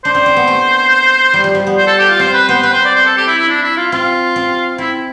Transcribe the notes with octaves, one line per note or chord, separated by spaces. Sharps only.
D4 C5
C4
C4
B3
A3
G3
F3
G3
B3
C5
A4
G4
F4
C4 C5
B4
B3 C5
C4 B4
C5
D5
C5
A4
G4
E4
E4
D4
E4
F4
C4 F4
C4
C4 E4